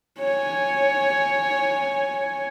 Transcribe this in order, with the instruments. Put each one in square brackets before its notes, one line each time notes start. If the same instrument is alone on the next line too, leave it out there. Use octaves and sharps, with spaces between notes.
[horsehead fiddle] C#5 G#5